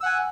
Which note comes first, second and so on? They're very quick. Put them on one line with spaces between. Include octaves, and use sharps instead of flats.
E6 F#5 G#5